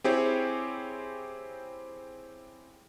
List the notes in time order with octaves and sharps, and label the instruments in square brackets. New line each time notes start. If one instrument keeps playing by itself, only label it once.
[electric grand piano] C4 E4 G4 G#4 C5 C#5